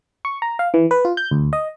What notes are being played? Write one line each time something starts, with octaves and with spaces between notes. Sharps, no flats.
C#6
A#5
F5
E3
B4
F4
G6
D2
D#5